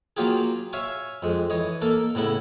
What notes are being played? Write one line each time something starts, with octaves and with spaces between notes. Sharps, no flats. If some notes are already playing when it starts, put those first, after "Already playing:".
F#3 A#3 F4 G4 G#4
C#5 E5 F5 G#5 C#6
F2 G#3
E3 C#5 D#5
A#3 A4 A#4
A2 C#3 B3 E4